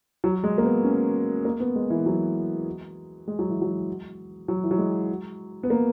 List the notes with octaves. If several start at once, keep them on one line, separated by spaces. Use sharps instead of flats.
F#3
G#3
A#3
B3
C#4
A#3
B3
G#3
E3
F#3
G#3
F#3
E3
F#3
F#3
E3
F#3
G#3
B3
A#3